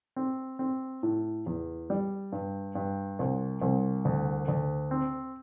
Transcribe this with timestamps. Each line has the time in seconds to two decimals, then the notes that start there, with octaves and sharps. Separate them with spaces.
0.16 C4
0.59 C4
1.03 A2
1.46 E2
1.90 G3
2.32 G2
2.75 G2
3.19 C2
3.61 C2
4.05 D2
4.48 D2
4.91 C4